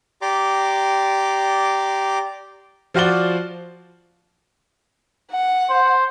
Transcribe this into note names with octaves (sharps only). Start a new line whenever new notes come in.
G4 D5 A#5 C6 D6
F3 F4 F#4 D5 G7
F#5
C5